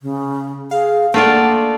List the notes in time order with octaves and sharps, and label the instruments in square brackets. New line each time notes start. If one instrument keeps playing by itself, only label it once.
[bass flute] C#3
[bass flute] G#4 [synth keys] F5
[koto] A3 F4 D5 [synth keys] A#3 D4 [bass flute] F#5